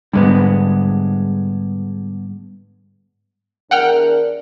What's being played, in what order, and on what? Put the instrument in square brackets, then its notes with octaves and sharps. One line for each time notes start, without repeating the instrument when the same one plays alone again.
[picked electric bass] G#2 G3 [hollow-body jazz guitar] D3 G#3 B3
[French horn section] E2 D4 A#4 [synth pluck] F#5 G5 F6